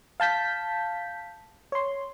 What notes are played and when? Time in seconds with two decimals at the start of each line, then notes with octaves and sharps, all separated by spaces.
0.20 F5 A5 G6 B6
1.72 C#5 C6